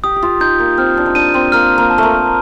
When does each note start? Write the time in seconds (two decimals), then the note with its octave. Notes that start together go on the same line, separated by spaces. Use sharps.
0.04 G4 D#6
0.16 G4
0.22 F4
0.40 D#4 G6
0.59 A#3
0.78 C4 F6
0.97 D4
1.06 D#4
1.15 D4 D#7
1.34 C4
1.52 A#3 F6
1.78 A#3
1.90 A5
1.98 A3 A#3